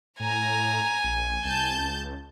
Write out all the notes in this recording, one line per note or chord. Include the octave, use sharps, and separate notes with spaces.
A2 G#5 A#5
A#1
C2 A5 G6
C#2